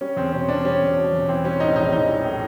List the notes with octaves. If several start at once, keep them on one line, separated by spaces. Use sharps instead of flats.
G3 C#4
E2 C4
B2 C#4
E2 D4
G3 C#4
E2
B2
E2
E3 C4
G3 C#4
A2 D#4
A#1 D#4
E3 D#4
G3
A2